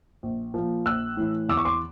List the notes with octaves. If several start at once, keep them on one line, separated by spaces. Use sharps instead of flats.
A#1
A#2 F3
A#1 E6 F#6
A2 E3
E2 D6 E6
C#6
C6 D6